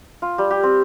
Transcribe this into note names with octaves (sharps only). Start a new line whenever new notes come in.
F4
G3
G4
C4